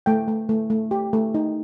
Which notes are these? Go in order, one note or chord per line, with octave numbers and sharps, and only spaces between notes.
A3 G5
A3
A3
A3
G4
A3
D#4